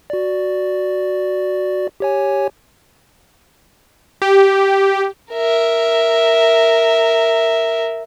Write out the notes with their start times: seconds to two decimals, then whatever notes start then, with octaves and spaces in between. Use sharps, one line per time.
0.10 F#4 D5
2.00 G4 C#5 G#5
4.22 G4
5.33 A#4 E5